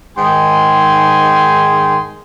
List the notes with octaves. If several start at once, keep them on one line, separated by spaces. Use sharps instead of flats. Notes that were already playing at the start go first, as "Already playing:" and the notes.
G#2 D#3 G#4 G5 G#5 C6